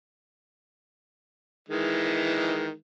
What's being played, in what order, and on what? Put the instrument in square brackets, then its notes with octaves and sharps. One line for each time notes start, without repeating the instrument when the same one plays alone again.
[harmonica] D#3 E3 G#3